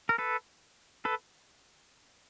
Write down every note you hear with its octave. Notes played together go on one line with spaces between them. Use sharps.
A#4
A4 B4
A4 B4